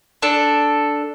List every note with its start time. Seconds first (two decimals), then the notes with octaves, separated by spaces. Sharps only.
0.22 D4 A4